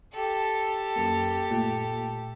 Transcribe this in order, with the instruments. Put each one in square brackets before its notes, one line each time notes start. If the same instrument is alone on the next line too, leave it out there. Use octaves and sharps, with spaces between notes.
[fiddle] G4 A4
[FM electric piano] F#2 A#3
A#2 A3